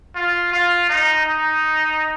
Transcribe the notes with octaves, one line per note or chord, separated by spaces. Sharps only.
F4
F4
D#4
D#4